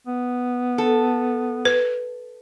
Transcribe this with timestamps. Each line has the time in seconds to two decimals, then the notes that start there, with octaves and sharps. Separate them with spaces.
0.07 B3
0.78 A4
1.65 B4